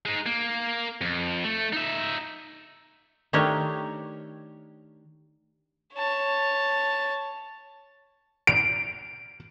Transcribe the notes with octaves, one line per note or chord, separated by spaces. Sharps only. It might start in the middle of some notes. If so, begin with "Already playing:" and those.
G#3 D#4
A#3
F2
A3
D#4 E5
D#3 A3 D4 G4 A#4 C#5
C#5 A5
D7